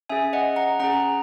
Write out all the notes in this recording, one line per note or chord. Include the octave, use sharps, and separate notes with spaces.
C#4 G#4 E5 G#5
D#5 F#5
F#5 A#5
C#4 G#4 F#5 A#5